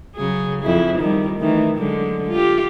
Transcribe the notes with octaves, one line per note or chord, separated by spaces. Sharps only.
C#3 F#3 G#4
F2 E4 G#4
D#3 F3 G3
D#3 E3 A3
D3 F#3 G#3
F4 G4